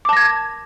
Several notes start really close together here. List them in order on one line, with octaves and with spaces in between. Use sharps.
D6 A5 A#6 G#6